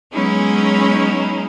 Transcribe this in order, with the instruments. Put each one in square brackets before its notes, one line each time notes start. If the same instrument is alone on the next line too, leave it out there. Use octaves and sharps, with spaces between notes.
[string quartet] F#3 G#3 B3 C#4 D#4 E4